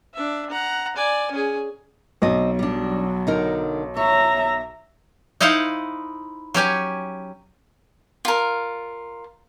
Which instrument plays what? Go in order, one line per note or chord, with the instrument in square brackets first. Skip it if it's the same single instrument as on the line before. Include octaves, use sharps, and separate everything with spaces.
[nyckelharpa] D4 E5
F#5 A#5
D5 G#5
C#4 G#4
[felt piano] B1 [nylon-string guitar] C4 D#5
[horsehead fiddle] F#3 [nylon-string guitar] G3 D4
[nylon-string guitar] D3 D#4 A#4
[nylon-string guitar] C#5 [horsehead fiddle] E5 A#5
[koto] D#4 E4 C5 F5 F#5
F#3 C#4 G4 G#5
[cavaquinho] F4 A#4